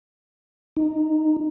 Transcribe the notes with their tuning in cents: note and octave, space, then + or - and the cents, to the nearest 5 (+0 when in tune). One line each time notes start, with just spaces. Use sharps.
D#4 -5